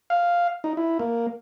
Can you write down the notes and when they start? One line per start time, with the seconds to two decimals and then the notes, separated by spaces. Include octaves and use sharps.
0.10 F5
0.64 D#4
0.77 E4
0.99 A#3